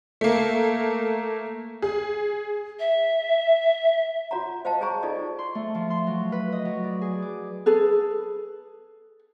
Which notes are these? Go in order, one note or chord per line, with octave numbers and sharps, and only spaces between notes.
A3 A#3
G#4
E5
F4 F#4 C#5 F#5 A#5
C5 D#5 F5 G5 A5
G#4 C5 C#5 G#5 A#5 C#6
D#4 F4 A4 D5 D#5
C6
A3
F3
C6
F#3
B4
D#5
F#3
D5
G#4
D6
G#4 A4 B4